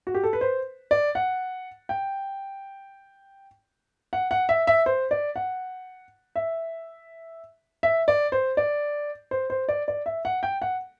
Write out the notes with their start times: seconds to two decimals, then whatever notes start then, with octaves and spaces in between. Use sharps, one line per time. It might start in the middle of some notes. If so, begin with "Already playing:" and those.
0.07 F#4
0.14 G4
0.23 A4
0.33 B4
0.41 C5
0.91 D5
1.15 F#5
1.89 G5
4.13 F#5
4.31 F#5
4.49 E5
4.67 E5
4.86 C5
5.11 D5
5.36 F#5
6.36 E5
7.83 E5
8.08 D5
8.32 C5
8.57 D5
9.31 C5
9.50 C5
9.69 D5
9.88 D5
10.06 E5
10.25 F#5
10.43 G5
10.62 F#5